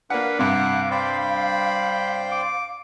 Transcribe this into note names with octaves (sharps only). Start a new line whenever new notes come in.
A#3 D4 B4 F5 F#5
G2 C3 F5 F#5 D6
C5 D5 G5 B5
D6